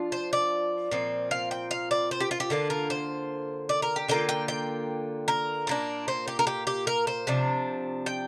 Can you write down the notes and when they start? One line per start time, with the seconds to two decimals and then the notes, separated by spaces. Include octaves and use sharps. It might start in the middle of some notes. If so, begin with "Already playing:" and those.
Already playing: F3 D4 F4
0.12 C5
0.33 D5
0.91 A#2 F3 C4
1.31 F5
1.51 G5
1.71 F5
1.91 D5
2.11 C5
2.20 G4
2.31 F4
2.40 G4
2.50 D3 A#3 D4 F4
2.70 A#4
2.90 C5
3.69 D5
3.82 A#4
3.96 G4
4.08 D3 A#3 F4 G5
4.29 G5
4.48 G5
5.28 A#4
5.67 A#2 A#3 D4
6.08 C5
6.28 G4
6.39 A#4
6.47 G4
6.67 G4
6.87 A#4
7.07 C5
7.27 C3 F3 D4
8.06 G5